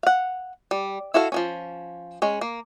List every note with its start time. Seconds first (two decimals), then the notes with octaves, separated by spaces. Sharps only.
0.03 F5 F#5
0.71 G3
1.14 E4 F#4 A4 F5
1.32 F3 F#3 C#4
2.22 G#3 C#4
2.41 A#3